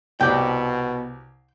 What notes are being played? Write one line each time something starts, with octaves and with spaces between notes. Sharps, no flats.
C2 B2 G4 D5 G5